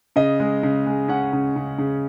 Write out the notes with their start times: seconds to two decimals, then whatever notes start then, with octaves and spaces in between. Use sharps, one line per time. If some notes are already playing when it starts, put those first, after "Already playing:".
0.16 C#3 D#5
0.40 G#3
0.63 C#3
0.86 G#3
1.08 C#4 F#5
1.33 C#3
1.56 C#3
1.78 C#3